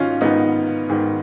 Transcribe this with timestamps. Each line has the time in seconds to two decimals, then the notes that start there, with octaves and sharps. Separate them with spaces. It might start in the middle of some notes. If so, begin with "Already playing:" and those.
Already playing: G#2 D#3 C#4 D#4 F4
0.21 G#2 D#3 B3 D#4
0.89 G#2 D#3